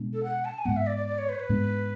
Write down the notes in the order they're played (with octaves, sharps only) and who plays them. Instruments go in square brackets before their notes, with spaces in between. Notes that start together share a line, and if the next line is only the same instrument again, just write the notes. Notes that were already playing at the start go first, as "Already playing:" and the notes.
Already playing: [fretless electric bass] B2 G#3 B3 D4
[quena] A4
F#5
A5
G#5
[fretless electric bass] G#2 G#3 B3 [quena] F#5
[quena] E5
D5
D5
D5
C#5
B4
C#5
B4
[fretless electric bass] G#2 G#3 B3 D4